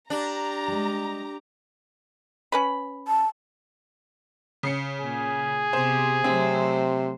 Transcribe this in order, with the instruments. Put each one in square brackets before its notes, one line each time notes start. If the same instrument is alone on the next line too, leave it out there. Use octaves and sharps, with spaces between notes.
[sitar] D4 [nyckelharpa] G4 [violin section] A#5
[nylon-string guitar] G3 G#3
[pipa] C#4 B4 B5
[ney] A5
[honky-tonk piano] C#3 C7 C#7
[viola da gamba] A#2 [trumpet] G#4
[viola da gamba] C3 B3 G4 [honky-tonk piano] C5
[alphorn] C3 [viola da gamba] F#3 A3 C5 [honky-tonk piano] C4